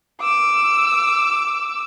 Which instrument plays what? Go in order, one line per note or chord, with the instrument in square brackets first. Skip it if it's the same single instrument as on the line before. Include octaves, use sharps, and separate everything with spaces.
[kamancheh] D6 E6